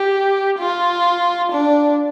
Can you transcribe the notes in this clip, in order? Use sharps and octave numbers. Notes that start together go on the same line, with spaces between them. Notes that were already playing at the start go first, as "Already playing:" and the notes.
Already playing: G4
F4
D4